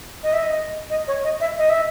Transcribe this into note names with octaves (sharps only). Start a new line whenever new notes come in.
D#5
E5
D#5
D#5
C#5
D#5
E5
D#5
E5